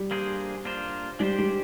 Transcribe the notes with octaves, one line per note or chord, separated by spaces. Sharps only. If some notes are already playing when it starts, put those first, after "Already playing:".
Already playing: G3
A#3 D4 G#4 C5
A#3 D4 F4 C5
G3 G#3 D4 G4 C5
G3